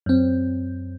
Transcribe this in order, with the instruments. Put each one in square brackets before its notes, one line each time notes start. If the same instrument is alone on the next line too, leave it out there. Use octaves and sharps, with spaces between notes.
[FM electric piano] F#2 C4